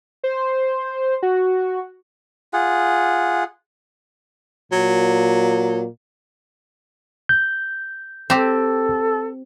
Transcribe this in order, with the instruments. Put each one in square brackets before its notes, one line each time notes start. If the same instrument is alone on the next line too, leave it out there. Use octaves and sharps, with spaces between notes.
[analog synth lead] C5
F#4
[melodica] F4 G#4 F#5
[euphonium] A#2 [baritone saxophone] F#3
[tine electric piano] G6
[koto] C4 G4 [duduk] A4